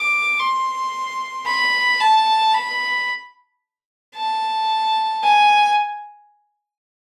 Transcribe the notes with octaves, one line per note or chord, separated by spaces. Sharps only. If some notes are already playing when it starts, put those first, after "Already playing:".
Already playing: D6
C6
B5
A5
B5
A5
G#5